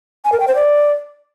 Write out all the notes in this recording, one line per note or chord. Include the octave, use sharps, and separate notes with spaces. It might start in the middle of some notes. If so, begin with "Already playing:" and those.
G#5
A#4
G5
C5
D5